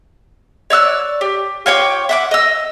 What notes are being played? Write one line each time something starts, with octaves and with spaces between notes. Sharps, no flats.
C#5 D5 E6 F#6
G4
F4 C#5 G5 D6
E5 F#5 D6
D#5 E6